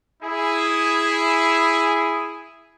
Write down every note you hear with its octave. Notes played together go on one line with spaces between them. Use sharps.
E4 G#4